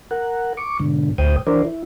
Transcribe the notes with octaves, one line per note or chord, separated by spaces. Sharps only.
A#4 F#5
C#6 D6
G#2 B2 D3
D2 A2 C5 G5 D#6
E3 D4 A#4 C5 D5
E4